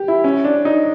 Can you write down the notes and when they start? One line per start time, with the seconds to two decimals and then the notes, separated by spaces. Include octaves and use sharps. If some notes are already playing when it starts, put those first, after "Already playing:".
Already playing: G4
0.08 E4
0.24 C#4
0.44 D4
0.65 D#4